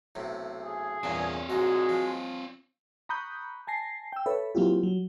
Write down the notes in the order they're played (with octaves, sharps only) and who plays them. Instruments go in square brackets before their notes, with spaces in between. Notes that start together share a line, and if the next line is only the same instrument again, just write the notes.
[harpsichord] B1 A2 C3
[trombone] G#4
[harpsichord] E2 G2 A#2 [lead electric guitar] C4 C#5
[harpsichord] A#1 G#2 D#5 [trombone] G#3 [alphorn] F#4
[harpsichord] F3
[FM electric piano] A#5 B5 C#6 D#6 F#6 G6
G#5 A5 A#6 C7
G5 E6
A4 B4 C#5 E5 B5
F#3 A#3 C4 E4 F4 G4
F#3